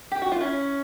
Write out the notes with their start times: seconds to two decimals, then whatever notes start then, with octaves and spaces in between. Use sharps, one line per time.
0.12 G4
0.22 F#4
0.32 F4
0.41 C#4 E4